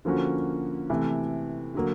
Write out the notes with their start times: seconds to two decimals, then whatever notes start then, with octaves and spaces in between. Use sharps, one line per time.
0.05 D3 F3 A#3 C#4 F#4
0.90 C3 E3 A3
1.75 D3 F#3 A#3